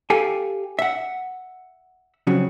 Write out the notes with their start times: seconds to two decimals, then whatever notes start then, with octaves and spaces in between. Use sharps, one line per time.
0.10 G4 A4 F5 G5 G#5
0.79 E5 F#5
2.27 F2 C#3 F#3